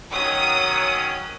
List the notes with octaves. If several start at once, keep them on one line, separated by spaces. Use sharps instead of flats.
D#3 F#3 C#4 D#6